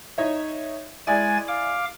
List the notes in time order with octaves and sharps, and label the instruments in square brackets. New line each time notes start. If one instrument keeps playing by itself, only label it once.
[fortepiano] D#4 C#5 E5
[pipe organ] G#3 G#5 A6 [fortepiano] E4 G#4 D5
[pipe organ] F5 D6